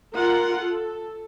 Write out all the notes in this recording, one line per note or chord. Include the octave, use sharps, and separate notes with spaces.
F4 A#4 F#5
A4